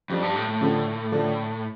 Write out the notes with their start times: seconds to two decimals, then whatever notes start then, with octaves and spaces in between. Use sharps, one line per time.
0.10 F2 G3 D4 G4
0.23 G2
0.36 A2
0.48 A2
0.61 D3 F3 D4 A4
1.12 D3 F3 D4 A4